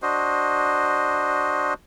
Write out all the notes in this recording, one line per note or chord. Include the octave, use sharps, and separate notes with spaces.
D4 F#4 C5 D#5